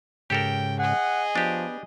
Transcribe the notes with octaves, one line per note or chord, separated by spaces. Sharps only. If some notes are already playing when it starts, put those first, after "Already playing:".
G#2 C#3 G4 A4 A#4 G5
G#4 D#5 F#5
F3 B3 D4 G4